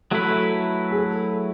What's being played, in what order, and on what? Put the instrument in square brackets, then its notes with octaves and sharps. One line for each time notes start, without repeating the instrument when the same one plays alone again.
[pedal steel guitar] F#3 A3 E4 B4 [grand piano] A4
[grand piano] G#4
A4